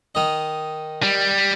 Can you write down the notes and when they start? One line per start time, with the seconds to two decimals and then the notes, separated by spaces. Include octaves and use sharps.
0.15 D#3 D#5
1.03 G3